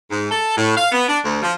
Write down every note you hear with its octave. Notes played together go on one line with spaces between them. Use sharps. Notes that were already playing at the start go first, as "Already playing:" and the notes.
G#2
A4
A2
F5
B3
D4
D2
F3